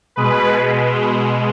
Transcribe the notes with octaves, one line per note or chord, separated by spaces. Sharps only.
B2 G#3 B4